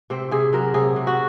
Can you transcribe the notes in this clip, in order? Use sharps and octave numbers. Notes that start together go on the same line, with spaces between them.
C3 C4
C3 G#4
F#3 A#4
C3 G#4
C3
F#4